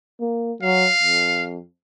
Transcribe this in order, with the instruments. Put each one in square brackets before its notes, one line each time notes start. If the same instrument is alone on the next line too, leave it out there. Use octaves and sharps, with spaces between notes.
[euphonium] A#3
[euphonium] F#3 [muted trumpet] F5
[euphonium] F2